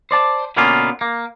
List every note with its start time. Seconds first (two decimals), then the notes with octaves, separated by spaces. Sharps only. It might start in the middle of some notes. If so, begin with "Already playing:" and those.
0.11 C5 D5 A5
0.56 B2 D3 A#3 B3 C#4 F4
1.01 A#3